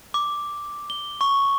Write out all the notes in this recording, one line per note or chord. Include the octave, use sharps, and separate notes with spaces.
D6
G7
C#6